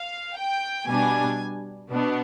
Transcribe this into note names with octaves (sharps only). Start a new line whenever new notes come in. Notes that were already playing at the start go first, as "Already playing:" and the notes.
Already playing: F5
G5
B2 G3 D4 G#5
B2 B3 D4